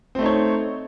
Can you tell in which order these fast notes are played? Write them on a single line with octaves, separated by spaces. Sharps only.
C4 A3 D#4 C#5